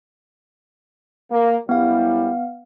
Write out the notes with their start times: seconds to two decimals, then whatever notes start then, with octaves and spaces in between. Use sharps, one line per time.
1.31 A#3
1.69 F#2 G3 B3 E4 F5